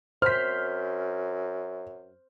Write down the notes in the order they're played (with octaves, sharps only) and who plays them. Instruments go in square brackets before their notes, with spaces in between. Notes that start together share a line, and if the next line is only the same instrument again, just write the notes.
[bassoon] F#2 [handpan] C5 [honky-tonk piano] F6 B6